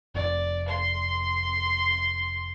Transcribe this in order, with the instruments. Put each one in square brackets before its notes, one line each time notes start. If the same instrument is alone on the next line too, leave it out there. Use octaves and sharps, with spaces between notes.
[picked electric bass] F1 [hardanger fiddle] D5
[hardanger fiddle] C6